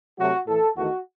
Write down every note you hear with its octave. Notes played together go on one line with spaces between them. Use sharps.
C3 F#3 A3 F#4
A2 E3 A3 A4
E2 D#3 A3 F#4